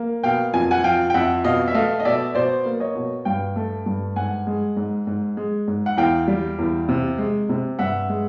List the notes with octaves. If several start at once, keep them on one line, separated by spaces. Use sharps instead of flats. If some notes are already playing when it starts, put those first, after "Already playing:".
Already playing: A#3
B2 F5 G5
F2 G#5
F#5 G#5
F3 F5 G5
G5
F2 E5 F#5
B2 D#5 F5
E5
A3 D#5 F5
D#5
B2 D5 E5
B2 C5 D5
A#3
C#5 D#5
B2
G2 F5 G5
A3
G2
G#2 F#5 G#5
G#3
G#2
G#2
G#3
G#2
F#5
E2 F5 G5
G3
E2
C3
G#3
C3
G2 E5 F#5
G#3